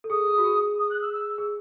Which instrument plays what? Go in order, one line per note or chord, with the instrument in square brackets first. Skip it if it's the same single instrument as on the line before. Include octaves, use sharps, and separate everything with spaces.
[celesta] A4
[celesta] G#4 [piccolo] D#6
[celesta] G#4
F#4
G#4
[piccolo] D#6
F#6
E6
E6
[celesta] G#4